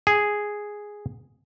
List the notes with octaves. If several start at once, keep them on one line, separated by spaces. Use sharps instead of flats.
G#4